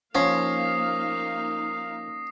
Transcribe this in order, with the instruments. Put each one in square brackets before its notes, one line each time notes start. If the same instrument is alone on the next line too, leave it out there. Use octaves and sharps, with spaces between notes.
[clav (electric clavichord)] F3 [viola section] A#3 D#4 F5 [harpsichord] C#4 [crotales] D#6 A#6 C7